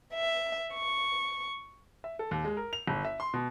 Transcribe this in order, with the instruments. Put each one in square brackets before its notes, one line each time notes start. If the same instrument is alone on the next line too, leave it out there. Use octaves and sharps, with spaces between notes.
[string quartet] E5
C#6
[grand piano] E5
A4
D#2
G#3
A#4
F7
G1
E5
C6
B2